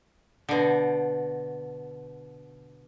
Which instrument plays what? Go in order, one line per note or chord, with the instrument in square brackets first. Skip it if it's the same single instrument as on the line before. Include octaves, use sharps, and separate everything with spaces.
[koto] B2 D3